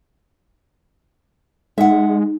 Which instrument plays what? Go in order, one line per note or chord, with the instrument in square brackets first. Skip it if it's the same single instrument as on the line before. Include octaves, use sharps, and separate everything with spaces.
[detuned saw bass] G#3 [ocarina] D#4 [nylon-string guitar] E5 F#5